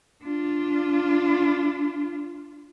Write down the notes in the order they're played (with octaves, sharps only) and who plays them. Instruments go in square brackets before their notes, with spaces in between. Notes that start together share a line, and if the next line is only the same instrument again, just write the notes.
[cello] D4 F4